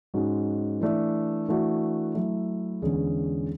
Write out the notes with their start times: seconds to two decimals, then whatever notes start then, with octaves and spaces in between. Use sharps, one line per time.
0.14 G#2 G#3 C#4 F#4
0.80 E3 A3 D4
1.48 E3 A3 D4 F#4
2.15 F#3 A3 E4
2.82 E2 D3 G#3 C#4 G#4